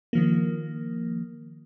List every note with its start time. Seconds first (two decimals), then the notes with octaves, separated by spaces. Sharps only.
0.13 D#3 F3 A#3